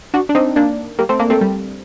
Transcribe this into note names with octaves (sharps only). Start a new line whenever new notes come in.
D4 F#4
D4
C4 D#4
A#3 D4
G3 A#3
A3 C4
A#3 D4
A3 C4
G3